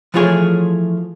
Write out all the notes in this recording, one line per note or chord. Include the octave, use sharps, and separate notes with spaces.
E3 F3 A3 F4 G#4 C#5